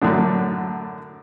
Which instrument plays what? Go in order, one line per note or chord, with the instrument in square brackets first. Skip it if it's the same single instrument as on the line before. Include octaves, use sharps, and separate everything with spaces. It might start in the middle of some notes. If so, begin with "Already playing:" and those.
[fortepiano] F#2 A2 D3 D4